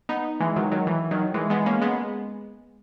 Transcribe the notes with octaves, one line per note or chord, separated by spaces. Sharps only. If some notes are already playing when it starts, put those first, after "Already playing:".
B3 D#4
E3 G#3
D#3 F#3
D#3 F#3
E3
D#3 F#3
E3 G#3
G#3 B3
A#3 C#4
G#3 B3